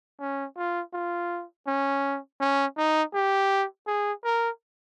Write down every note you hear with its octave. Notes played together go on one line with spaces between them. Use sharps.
C#4
F4
F4
C#4
C#4
D#4
G4
G#4
A#4